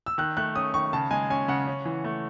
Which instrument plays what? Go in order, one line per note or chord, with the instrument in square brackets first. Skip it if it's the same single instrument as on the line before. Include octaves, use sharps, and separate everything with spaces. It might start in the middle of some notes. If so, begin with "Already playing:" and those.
[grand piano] E6
D#3 F#6
A3 F#6
C#4 D#6
D#3 C#6
C#3 A5
G#3 G#5
C#4 G#5
C#3 F#5
C#4
E3
A3